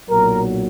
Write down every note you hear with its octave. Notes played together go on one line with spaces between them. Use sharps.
B1 A#2 F#3 A#4